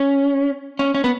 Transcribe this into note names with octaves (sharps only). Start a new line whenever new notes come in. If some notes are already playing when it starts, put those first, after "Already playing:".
Already playing: C#4
C#4
C#4
B3